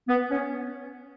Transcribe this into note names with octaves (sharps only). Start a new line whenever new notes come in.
B3
C#4